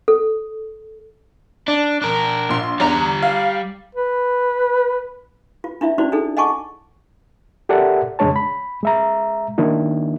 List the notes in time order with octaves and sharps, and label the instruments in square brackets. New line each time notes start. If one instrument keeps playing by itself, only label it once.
[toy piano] A4
[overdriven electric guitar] D4
D4 A#4
[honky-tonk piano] A#1 C6
[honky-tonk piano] E2 D4 [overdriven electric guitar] G3 A#5
[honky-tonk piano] F5
[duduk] B4
[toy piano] F4
D4 E4 F4 E5
C#4 D#4 E4 F#4 C5 D5
D4 D#4 G#4 A4
D#5 F#5 G#5 A5 C#6 D6
[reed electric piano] G4 A4 A#4 D5 E5 F#5
F2 C#3 G#3 D4 C#5 A5
B5
G#3 E5 A#5
D#3 A#3 D4 E4